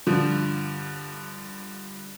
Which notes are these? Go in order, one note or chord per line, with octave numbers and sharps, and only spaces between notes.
G2 D3 F3